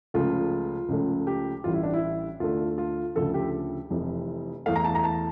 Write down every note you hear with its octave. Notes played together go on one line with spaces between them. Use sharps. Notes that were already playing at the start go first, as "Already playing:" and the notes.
C#2 C#3 F3 A3 F4
C#2 C#3 F3 A3
G4
A1 A2 E3 G3 F4
E4
D4
E4
D2 D3 A3 F4
F4
D2 C#3 F3 A4
G4
F1 F2 E3
E2 E3 A3 F5
A#5
A5
A#5
A5